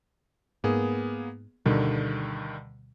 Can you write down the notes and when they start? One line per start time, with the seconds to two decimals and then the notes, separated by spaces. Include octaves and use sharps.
0.64 G#2 A#3 B3 G#4
1.66 D2 G2 B2 D3 D#3 G3